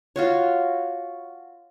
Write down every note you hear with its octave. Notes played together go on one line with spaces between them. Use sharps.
F4 F#4 C#5